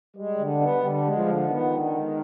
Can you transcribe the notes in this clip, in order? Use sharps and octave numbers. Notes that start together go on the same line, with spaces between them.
G3 G#3
D3
B3
D3 G3
G#3
F3
D3
D#3 B3
D3
G#3